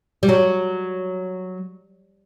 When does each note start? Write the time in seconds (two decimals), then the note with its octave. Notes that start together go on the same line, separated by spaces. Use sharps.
0.23 G3
0.29 F#3